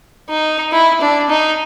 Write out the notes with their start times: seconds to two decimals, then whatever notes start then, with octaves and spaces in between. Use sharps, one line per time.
0.30 D#4
0.72 E4
1.01 D4
1.29 D#4